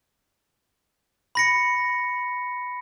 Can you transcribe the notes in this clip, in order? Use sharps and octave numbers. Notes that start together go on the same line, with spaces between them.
B5 A#6 C#7